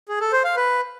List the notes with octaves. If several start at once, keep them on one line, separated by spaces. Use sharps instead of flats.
G#4
A4
C5
F5
B4